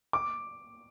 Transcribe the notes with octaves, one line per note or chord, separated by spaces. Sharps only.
D6